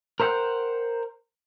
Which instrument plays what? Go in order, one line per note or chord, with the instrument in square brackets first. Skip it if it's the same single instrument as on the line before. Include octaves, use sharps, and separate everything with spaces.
[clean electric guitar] A#4 C5 E5 F#5 G5